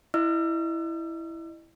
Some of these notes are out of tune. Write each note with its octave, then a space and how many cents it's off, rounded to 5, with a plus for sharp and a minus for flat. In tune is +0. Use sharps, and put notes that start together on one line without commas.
E4 +0 D#5 -30 E6 +40